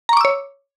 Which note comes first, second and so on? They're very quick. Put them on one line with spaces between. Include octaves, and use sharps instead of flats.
A#5 C#6 D6 E6 C#5